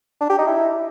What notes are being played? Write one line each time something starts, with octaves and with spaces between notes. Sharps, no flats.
D4
G4
D#4
E4